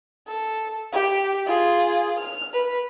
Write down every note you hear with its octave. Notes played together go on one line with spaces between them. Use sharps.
A4
G4
F4 G#4
F6
B4